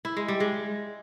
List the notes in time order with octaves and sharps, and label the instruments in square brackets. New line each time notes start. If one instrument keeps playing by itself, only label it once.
[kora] E4
G#3
G3
G#3